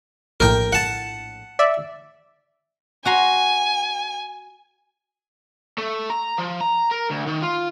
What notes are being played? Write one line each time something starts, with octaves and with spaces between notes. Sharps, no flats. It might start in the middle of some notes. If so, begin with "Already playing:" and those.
A#1 A2 A#4 G5
F#5 A5
D5 E5
F#4 G#5 A#5 C6
A3
A#5
F3
A#5
A#4
D2
D#3
F4